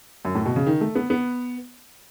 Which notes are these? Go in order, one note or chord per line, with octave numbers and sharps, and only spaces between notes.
F#2
A2
B2
C#3
D#3
A3
B3
B3